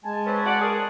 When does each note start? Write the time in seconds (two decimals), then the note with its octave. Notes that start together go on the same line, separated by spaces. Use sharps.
0.05 G#3 G#5 A5
0.26 C4 C#4 B4
0.45 F#4 D5 F#5
0.61 G#4 A#4